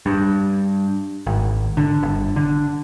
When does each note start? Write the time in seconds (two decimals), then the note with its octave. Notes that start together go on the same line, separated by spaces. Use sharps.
0.06 G2
1.27 G#1
1.77 D3
2.03 G1
2.36 D3